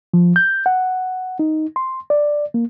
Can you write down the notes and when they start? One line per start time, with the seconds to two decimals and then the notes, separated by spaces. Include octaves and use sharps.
0.14 F3
0.36 G6
0.66 F#5
1.39 D#4
1.76 C6
2.10 D5
2.54 A#3